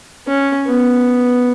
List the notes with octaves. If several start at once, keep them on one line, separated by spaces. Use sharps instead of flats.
C#4
B3